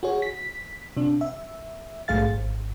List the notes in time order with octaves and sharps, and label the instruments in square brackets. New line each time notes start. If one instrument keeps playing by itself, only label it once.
[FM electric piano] F#4 G#4 C#5
B6
C3 D4
E5
A#1 G#2 A3 G#4 F5 A6
G#1